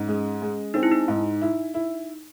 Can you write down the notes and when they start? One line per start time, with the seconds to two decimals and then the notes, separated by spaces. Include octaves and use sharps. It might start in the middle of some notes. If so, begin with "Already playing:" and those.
Already playing: G#2 C#4
0.08 G#3
0.42 G#3
0.74 C4 D#4
0.83 E4
0.92 D#4
1.08 G#2
1.41 E4
1.74 E4